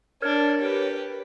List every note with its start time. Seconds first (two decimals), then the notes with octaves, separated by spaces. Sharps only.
0.22 D4 A#4 C#5
0.61 G4 B4